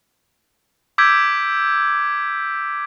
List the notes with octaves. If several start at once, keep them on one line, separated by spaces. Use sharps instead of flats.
D6 E6 G6 G#6 B6 D7